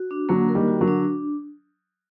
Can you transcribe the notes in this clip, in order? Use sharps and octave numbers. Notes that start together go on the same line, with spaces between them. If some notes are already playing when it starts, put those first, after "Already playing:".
Already playing: F#4
D4
D3 F#3 A#3
A#4
D#3 G3
F#4
D3 F#3
D4